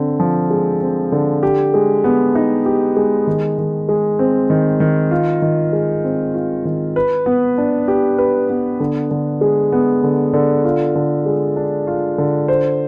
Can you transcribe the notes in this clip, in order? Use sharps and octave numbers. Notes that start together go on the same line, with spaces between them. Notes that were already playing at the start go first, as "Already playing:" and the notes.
Already playing: D3 C4
F3
G#3
C4
D3
G4
G#3
B3
D#4
G4
G#3
D#3
D#3
G#3
C4
D#3
D#3
F4
D#3
G#3
C4
F4
D#3
B4
B3
D4
G4
B4
B3
D3
D3
G#3
B3
D3
D3
F4
D3
G#3
D4
F4
D3
C5